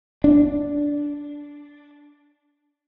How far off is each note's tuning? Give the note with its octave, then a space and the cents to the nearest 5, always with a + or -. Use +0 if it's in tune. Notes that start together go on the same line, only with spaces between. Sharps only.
D4 -10